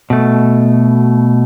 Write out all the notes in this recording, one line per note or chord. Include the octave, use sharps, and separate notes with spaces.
B2 A3